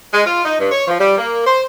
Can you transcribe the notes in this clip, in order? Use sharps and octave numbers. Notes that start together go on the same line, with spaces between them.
G#3
F4
D#4
G2
C#5
F3
G3
A#3
C5